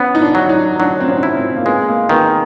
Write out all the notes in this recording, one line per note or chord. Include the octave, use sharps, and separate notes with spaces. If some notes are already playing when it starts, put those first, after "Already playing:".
Already playing: B3 C#4
D#4
D4
F#3
D#4
F#3 D4
C4
C#4
E4
C4
A#3
G#3 B3
A#3
D#3 B3